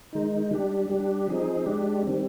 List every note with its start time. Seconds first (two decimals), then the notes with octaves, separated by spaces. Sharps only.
0.13 D#3 G#3 D#4
0.51 G3 D4 G4
0.90 G3 D4 G4
1.27 F3 C4 D#4 G#4
1.66 G#3 D4 G4
2.03 D#3 G3 C4